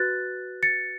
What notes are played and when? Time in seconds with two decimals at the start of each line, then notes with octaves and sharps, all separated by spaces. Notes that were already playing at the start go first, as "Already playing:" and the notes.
Already playing: F#4 B4 F#6 A6
0.63 A6 C#7